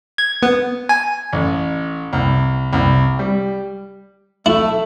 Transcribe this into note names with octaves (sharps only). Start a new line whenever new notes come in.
G#6
B3
G#5
A1
C2
C2
G3
A3 E4